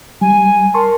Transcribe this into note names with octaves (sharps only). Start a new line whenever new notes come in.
G3 G#5
A#4 A5 C6 C#6